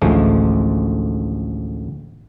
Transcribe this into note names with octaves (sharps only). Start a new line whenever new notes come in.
A1 D2 F3 G#3 A3